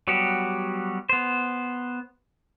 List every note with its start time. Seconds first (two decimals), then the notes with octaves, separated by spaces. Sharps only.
0.08 F#3 G3 B3 F#4 G4
1.09 B3 C5